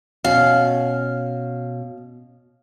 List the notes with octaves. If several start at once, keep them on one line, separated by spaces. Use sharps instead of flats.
B2 C#4 F#4 F5